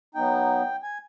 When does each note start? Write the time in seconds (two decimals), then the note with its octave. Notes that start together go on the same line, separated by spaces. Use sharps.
0.15 F#3 B3 D#4 G5
0.83 G#5